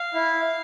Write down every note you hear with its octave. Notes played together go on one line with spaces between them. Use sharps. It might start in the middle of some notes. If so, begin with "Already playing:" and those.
Already playing: F5
E4